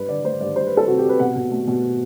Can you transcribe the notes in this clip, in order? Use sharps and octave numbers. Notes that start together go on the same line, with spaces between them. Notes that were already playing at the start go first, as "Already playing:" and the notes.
Already playing: G2 B4
D3 D5
A3 C5
G2 D5
G3 C5
B4
G3
A4
C3 F#4
G4
C3
B4
B2 F#5
B2
A3
B2